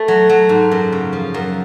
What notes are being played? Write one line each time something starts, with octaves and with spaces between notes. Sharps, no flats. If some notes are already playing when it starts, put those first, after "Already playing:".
Already playing: A3
F#3
F#3
G#2
F#2
C#3
F3
F#2